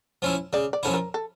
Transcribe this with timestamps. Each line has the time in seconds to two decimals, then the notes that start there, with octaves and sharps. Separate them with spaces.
0.22 F3 C#4 E4
0.53 C#3 D5
0.73 D5
0.83 F3 C#4 E4 A4
0.94 A#4
1.14 A4